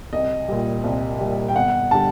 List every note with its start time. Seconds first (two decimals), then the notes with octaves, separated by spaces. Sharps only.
0.13 C2 D#5
0.48 A#2 G3
0.84 C2
1.20 A#2 G3
1.49 G5
1.55 G1 F#5
1.91 D3 G3 A5